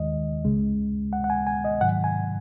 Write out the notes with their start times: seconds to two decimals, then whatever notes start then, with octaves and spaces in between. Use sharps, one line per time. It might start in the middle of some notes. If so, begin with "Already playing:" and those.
Already playing: D#2 D#3 G#3 D#5
0.44 C#2 C#3 G#3
1.13 F#5
1.24 F#5
1.30 G#5
1.47 G#5
1.64 D#5
1.81 G#2 D#3 F#3 F#5
2.04 G#5